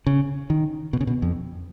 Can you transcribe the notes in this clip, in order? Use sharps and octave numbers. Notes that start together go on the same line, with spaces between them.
C#3
D#3
B2
C#3
B2
F2